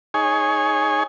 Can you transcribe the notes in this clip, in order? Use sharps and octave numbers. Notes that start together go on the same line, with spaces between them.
D#4 G#4 C#5 G#5